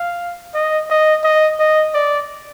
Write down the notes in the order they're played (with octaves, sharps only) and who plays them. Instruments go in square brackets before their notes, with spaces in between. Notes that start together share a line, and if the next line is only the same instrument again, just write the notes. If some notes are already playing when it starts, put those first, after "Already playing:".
Already playing: [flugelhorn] F5
D#5
D#5
D#5
D#5
D5